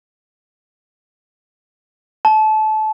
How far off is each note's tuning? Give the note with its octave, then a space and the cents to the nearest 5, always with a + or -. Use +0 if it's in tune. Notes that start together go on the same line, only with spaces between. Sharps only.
A5 -25